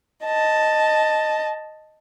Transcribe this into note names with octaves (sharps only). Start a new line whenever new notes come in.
D#5 A5